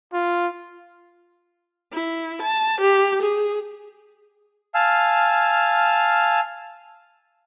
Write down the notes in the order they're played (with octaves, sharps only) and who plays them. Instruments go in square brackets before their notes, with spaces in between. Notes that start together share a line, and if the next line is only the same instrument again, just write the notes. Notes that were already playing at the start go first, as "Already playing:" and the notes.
[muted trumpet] F4
[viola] E4
A5
G4
G#4
[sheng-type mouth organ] F5 G#5 A5 E6 F6